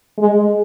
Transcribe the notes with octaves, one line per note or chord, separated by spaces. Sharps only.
G#3